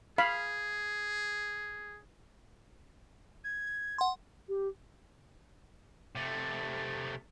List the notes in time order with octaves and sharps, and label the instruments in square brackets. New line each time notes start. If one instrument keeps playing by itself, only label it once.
[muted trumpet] G#4 [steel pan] F5 B5
[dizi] G#6
[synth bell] F#5 C6
[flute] G4
[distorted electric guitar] C3 A3